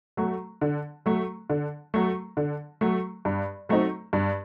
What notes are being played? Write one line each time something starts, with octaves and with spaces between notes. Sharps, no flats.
F#3 A3
D3
F#3 A3
D3
F#3 A3
D3
F#3 A3
G2
F#3 A3 C4 D#4
G2